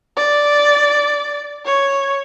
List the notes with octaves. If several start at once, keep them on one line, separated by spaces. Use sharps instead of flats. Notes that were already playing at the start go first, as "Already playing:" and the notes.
D5
C#5